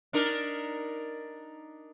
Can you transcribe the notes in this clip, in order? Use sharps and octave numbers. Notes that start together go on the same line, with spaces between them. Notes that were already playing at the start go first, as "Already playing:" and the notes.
D4 D#4 A#4